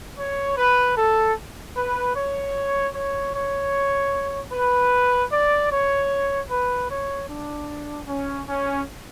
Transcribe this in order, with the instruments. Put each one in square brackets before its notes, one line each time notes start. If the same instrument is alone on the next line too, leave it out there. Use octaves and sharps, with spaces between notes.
[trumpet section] C#5
B4
A4
B4
C#5
C#5
C#5
B4
D5
C#5
B4
C#5
D4
C#4
C#4